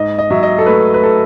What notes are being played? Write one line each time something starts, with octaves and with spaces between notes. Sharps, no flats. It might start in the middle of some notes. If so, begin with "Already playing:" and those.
Already playing: G#2 D#5
D#5
F#3 E5
D#5
A4
A3 B4
B4
A4